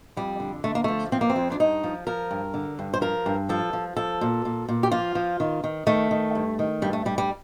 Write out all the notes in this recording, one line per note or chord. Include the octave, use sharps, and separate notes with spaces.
F2 G3
D3
D3 A3
A#3
F3 A3
F3 C4
A#3
C4
F2
D4
G2 D#4
F3
F3 A#4
G2
D3
G2
C5
F3 A#4
G2
F3 A4
F3
F3 A4
A#2
A#2
A#2
G4
F3 F4
F3
D#3
D#3
D#3 A3
D#3
G2
D#3
G2 G3
A3
G2 G3
G3